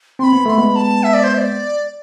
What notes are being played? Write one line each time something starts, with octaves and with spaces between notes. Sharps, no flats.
C4 B5 C6
B3
A3 C6
B5
G#3 B3
A5
E5
D5
C5
E5
D5